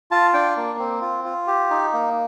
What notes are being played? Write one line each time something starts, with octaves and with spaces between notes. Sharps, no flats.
F4 A5
D4 G5
A#3
C4
F4
F4
G4
D#4
A#3